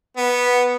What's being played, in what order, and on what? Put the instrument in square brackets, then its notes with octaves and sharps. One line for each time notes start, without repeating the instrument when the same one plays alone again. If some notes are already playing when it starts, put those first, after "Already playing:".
[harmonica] B3